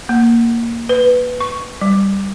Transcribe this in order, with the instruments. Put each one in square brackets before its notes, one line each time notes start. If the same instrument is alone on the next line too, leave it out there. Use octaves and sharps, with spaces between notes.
[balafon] A#3
B4
C#6
G3